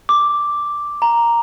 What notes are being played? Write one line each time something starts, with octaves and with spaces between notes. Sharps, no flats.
D6
A#5